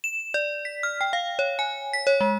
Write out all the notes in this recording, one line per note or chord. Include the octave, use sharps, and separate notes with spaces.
E7
D5
B6
F6
G5
F5
C#5
G#5
B6
C#5
G#3